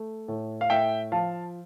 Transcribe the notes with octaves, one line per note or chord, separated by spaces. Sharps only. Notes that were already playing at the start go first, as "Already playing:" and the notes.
Already playing: A3
A2
F5
A2 E5 G5
F3 F5 A5